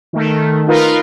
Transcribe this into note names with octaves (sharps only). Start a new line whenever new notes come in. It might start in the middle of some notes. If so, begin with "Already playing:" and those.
D#3 A3
D#4 F4 A#4 B4